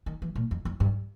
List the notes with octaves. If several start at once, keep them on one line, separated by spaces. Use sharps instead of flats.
D#3
E3
A#2
F2
F2
G2